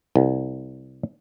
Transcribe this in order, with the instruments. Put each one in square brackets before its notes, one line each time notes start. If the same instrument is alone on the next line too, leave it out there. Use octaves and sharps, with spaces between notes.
[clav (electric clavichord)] C2